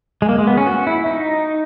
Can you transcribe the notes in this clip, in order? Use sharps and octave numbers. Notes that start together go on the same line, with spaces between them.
G#3
A#3
G#3
B3
C#4
F#4
E4
D#4